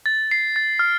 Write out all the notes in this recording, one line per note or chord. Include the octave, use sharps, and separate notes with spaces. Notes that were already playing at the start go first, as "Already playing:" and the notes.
A6
C7
A6
F6